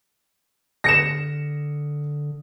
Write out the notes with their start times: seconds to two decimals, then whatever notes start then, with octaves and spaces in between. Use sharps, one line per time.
0.84 D3 A#6 C#7 E7